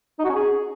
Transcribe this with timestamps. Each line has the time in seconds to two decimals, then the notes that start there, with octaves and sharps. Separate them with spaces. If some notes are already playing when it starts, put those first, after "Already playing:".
0.19 D#4
0.24 F#4
0.29 C#4
0.35 G#4